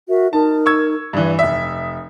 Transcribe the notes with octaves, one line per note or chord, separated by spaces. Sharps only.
F#4 A#4 E5
D#4 A#4 A5
C#6 E6 G#6
G2 E3 D5
F1 E5 D#6